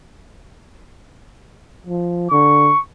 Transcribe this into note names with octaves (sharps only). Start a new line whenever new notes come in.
F3
D3 C#6